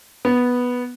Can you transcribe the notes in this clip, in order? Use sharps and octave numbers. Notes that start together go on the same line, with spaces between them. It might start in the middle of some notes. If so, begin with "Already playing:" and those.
B3